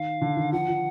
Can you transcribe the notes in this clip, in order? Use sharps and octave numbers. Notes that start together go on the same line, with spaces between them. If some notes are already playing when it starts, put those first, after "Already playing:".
Already playing: D#3 F5
D3
D#3
F3 F#5
F3